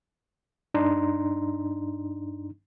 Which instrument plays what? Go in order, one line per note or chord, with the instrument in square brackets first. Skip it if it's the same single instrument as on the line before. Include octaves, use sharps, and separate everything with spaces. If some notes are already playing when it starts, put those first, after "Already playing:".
[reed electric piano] G2 D4 D#4 A#5 C6